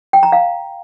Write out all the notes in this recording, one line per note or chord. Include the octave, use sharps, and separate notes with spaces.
G5
A#5
F5